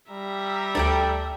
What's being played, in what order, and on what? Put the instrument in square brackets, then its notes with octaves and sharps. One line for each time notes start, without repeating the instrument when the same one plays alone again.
[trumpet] G3 [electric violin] E5 A#5
[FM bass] D2 [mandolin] A4 D5 G5